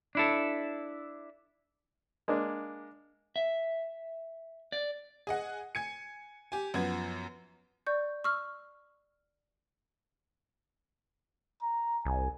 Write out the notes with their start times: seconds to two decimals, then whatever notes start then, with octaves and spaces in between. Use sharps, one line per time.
0.15 D4 E4 A4
2.28 G#3 A#3 D4
3.36 E5
4.72 D5
5.27 G#4 D#5 F#5
5.75 G#5 G#6 C#7
6.52 G4 G#5
6.74 F#2 F3 B3 G#6
7.87 D5 C#6 G6
8.24 C#6 E6 F6
11.63 A#5
12.05 C2 G#5